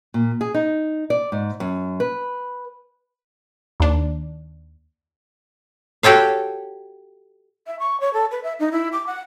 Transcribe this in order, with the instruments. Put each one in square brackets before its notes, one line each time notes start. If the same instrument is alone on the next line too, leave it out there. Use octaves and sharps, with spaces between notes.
[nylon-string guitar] A#2
G#4
D#4
D5
G#2
F#2
B4
[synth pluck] D#2 D4
[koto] F#4 G4 A4 C#5 F5
[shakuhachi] E5
C#6
C#5
A4
B4
E5
D#4
E4
D6
F#5